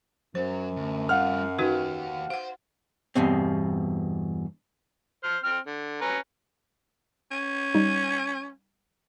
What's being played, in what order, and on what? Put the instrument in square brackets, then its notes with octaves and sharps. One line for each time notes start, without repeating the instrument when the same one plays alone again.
[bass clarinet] F#2 [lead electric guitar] F#3 [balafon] C5
[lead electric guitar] D2
[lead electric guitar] G3 F4 [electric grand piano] F5 F#5 F6
[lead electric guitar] D#3 G4 [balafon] D#4 F#4 B4
[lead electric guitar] C5 [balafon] F5 F#5
[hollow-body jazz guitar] E2 G2 B2 C4
[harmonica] C5 F6
C4 F6
D3
C#4 B4 A#5
[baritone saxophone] C#4
[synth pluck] G3 D#4